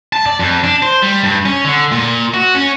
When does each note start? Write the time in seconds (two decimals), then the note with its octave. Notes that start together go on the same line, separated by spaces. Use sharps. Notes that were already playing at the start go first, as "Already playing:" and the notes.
0.13 A5
0.26 D5
0.39 F2
0.64 D4
0.82 C5
1.03 G3
1.24 G2
1.45 C#4
1.65 D3
1.92 A#2
2.34 F#4
2.54 C#4